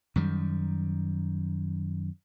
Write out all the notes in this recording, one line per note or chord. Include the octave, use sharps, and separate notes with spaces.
F#2 D#3 G3